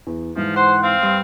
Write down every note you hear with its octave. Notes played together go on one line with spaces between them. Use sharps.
E2
G#2 E3 F3
C5 F#5 C6
C4 F5
G2